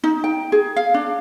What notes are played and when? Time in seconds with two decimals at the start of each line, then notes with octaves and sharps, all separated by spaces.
0.04 D#4
0.24 G5
0.52 G#4
0.76 F5
0.94 D4